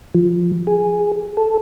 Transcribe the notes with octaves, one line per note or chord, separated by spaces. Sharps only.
F3
G#4
A4